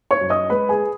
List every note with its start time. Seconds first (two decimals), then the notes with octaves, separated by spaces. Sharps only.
0.11 C#5 C#6
0.21 F#2
0.30 D#5 D#6
0.50 G#3 B4 B5
0.69 G#4 G#5